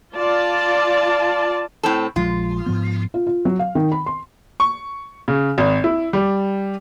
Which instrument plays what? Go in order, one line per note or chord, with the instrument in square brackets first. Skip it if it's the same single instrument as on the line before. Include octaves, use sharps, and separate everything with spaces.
[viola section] F4 D5 A5
[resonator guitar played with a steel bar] A2 C4 A4
[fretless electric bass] A#1 F3 G#3 [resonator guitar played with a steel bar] F4
[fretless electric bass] G#2 F3 B3
[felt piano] F4
F4
F#3
F5
D#3
B5
C6
[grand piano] C#6
C#3
G#1
E4
G3